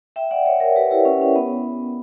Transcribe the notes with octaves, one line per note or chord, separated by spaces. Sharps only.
E5 G5
D5 F#5
C#5 E5
A#4 C#5
G4 B4
E4 G4
C#4
C#4
B3